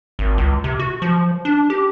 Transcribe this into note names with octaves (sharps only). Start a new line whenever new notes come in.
G#1
C#2
C3
F#4
F3
D4
G4